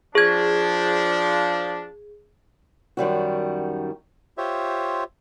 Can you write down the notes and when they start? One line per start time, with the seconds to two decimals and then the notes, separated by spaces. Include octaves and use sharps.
0.15 F3 D4 G#4 G#6
2.97 F#2 D#3 G3 F#4
4.38 F4 G4 C5 C#5 E5